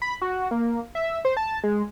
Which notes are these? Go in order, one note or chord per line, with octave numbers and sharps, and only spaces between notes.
B5
F#4
A#3
E5
C5
A5
G#3